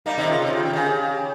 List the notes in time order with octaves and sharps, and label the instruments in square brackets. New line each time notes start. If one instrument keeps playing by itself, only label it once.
[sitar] G3 A#3 [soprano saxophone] D#4
[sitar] C3 D#3
[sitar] C#3 [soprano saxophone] F4
[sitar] C3
[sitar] C#3 [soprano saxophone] G4
[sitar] D#3
[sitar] C#3 [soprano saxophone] G#4
[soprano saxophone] G#4
G4